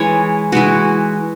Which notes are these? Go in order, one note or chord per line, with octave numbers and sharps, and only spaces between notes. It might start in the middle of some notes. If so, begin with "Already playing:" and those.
Already playing: E3 G#3 E4 C#5
E3 G#3 E4 F#4